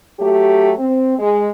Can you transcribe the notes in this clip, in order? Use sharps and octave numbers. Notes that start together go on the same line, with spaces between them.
F#3 A3 G4
C4
G#3